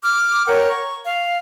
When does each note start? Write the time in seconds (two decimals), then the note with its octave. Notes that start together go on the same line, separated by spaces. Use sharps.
0.01 D6 F6
0.46 A#4 C#5 F#5 G5
0.67 C#6
1.04 F5